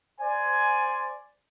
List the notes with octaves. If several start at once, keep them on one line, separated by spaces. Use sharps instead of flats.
C5 D5 G#5